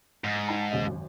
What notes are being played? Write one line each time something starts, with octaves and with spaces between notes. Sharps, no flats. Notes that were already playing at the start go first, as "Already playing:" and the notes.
G#2
D#4 G5 A5
D#2 C#3 D#5
G#1 F#2